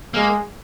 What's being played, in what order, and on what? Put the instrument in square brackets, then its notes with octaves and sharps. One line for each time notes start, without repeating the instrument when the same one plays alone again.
[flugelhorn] G#3 [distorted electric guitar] A#3